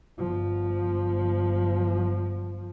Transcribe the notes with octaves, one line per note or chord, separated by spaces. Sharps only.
G1 F3